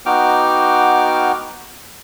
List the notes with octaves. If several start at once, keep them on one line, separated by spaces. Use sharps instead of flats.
B3 D#4 F#4 G5 D6 F6